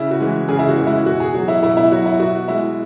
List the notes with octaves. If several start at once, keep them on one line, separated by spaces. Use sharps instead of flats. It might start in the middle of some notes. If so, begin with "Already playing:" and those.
Already playing: C#3 E4
F#4
E3 G#3
C#3 G#4
E4
F#4
E3 G#3
E4
B2 F#4
G#4
F#3 F#4
E4
B2 E4
E4
F#3 F#4
E4
B2 F#4
G#3 E4